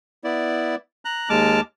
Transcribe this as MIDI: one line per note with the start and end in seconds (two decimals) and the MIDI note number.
0.24 0.75 59
0.24 0.75 64
0.24 0.75 74
1.05 1.29 82
1.05 1.29 90
1.30 1.61 39
1.30 1.61 56
1.30 1.61 81
1.30 1.61 86
1.30 1.61 89